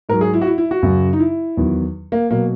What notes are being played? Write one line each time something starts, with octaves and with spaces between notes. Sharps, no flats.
G#2 F#3 A#4
G#4
E4
F#4
E4
E4
F#4
F#2 C#3 F#3
D#4
E4
E2 D#3 F#3
A#3
B2 F#3 A#3